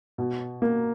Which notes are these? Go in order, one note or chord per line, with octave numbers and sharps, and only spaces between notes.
B2
A#3